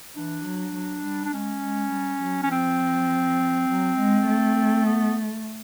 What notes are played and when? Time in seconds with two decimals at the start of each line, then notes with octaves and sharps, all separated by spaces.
0.16 E3 D4
0.45 F#3
0.75 F#3
1.04 G3
1.25 D4
1.34 G#3 C#4
1.63 G#3
1.92 G3
2.22 F#3
2.43 C#4
2.51 F3 C4
3.68 F#3
3.98 G#3
4.28 A3
4.85 B3